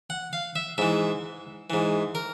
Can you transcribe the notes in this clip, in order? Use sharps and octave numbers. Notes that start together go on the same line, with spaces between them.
F#5
F5
E5
G#2 E3 E5
G#2 E3
A#4